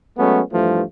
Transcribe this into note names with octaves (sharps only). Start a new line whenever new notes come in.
F#3 G#3 A3 B3 C#4
G2 E3 F3 A3